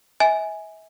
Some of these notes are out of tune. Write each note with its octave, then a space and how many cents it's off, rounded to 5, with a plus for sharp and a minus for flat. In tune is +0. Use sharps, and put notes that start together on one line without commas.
E5 -35 G#5 +0